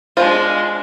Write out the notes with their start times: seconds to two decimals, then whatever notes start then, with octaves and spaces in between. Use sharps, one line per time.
0.17 G#3 D4 F4 C5